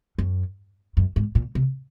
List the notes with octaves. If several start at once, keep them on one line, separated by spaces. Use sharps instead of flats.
F#2
F#2
G#2
A#2
C3